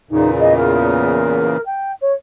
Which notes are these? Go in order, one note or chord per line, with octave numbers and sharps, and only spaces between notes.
E2 A#2 C#3 D#4
D#5
A#4
G5
C#5